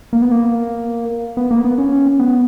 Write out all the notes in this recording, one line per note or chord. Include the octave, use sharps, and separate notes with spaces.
A#3
B3
A#3
B3
A#3
B3
C#4
B3